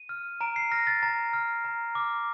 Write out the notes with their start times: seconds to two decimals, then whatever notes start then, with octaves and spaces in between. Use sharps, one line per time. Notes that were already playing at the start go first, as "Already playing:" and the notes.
Already playing: D#7
0.09 F6
0.41 A#5 D7
0.56 C7
0.71 F6 A#6
0.87 A6
1.03 A#5 A6
1.33 F6
1.64 A#5
1.95 D6 F6